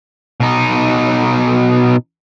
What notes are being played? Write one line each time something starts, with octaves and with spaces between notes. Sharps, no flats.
B2 D#4